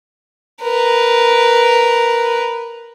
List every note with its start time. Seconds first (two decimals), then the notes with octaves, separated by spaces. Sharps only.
0.61 A#4 B4